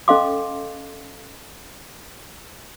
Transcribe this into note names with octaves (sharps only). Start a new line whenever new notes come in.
C#4 A4 D#5 F5 C6 D6